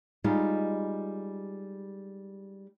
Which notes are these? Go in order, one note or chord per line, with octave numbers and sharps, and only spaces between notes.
G3 G#3 D#4 F4